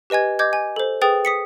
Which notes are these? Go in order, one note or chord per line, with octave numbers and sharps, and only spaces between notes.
G4 B4 D#5 G#5 G#6
D#5 D6 G6 G#6
G#5
A4 C5
G#4 B4 G5 D#6 A6
D#6 B6 C#7